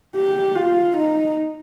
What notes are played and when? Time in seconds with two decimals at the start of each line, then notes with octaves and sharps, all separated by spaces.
0.16 G4
0.56 F4
0.97 D#4